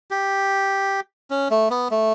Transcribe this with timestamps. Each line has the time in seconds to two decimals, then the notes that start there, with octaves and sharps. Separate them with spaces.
0.11 G4
1.30 C#4
1.51 A3
1.70 B3
1.91 A3